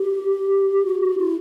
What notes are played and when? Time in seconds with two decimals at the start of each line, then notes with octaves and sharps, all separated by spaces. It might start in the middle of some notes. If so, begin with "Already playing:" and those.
Already playing: G4
0.85 F#4
1.02 F#4
1.18 E4